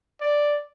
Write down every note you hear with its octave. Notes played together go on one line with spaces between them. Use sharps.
D5